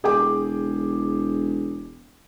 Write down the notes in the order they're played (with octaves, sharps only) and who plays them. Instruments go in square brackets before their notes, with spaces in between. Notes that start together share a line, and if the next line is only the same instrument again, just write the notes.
[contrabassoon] E1 [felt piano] G#4 G5 D6